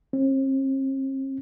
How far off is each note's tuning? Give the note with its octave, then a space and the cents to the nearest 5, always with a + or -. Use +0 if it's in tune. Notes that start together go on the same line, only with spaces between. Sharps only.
C4 +45